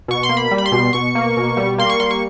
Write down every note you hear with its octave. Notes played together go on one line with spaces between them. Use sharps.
B2 C#6
C6
A#3
B5
G3
B5
C6
B2
B2 C#6
A#3
B2
G3
A#3 C6
C#6
G3 C6
C#6